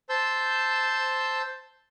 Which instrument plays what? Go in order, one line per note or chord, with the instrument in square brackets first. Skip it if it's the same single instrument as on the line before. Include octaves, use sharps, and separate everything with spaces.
[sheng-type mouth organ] C5 A5 E6 G6